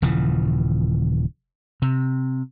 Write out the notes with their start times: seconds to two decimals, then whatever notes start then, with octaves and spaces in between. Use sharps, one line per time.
0.02 D#1 C#3 E3 F3
1.82 C3